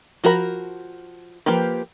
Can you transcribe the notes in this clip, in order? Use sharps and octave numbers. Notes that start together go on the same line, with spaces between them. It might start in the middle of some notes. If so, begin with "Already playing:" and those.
F3 F#4 A#4 B5
F3 A#3 G4 B4